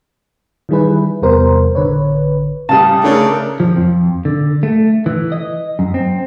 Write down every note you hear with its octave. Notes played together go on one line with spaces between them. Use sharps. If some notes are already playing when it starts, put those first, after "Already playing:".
D#3 E3 G3 E4 G#4 B4
E2 C3 G3 B3 A#4 C5
A1 D3 B4 C#5
C#3 G3 G4 A5 D#6
C#3 A3 D4 A#4
F3
F2
D3
A3
E3
D#5
F#2
C4